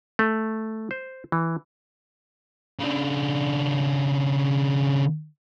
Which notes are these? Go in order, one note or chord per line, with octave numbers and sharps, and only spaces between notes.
A3
C5
E3
C#3 D4